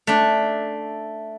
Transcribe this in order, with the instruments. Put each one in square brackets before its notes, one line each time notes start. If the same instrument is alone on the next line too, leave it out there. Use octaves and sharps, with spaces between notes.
[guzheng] A3 D4